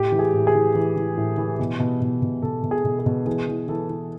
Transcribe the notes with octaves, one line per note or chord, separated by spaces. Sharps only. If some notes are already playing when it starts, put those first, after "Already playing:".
Already playing: A2 G4
E3
G#4
A2
G#4
E3
E3
E3
A2
E3
B2
B2
B2
B2
B2 A4
B2
G#4
B2
G#4
B2
E3 G#4
E3
E3 A4
E3